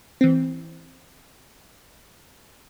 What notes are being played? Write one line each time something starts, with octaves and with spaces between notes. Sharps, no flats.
E3 C4